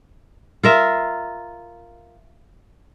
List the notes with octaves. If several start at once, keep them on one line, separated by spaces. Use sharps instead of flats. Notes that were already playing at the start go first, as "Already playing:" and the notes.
F4 A#4 E5